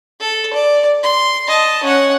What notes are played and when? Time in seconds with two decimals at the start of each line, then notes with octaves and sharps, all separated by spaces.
0.21 A4
0.53 D5
1.03 C6
1.48 D#5 A5
1.83 C#4 F#5